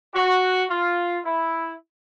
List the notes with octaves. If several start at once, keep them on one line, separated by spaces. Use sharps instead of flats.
F#4
F4
E4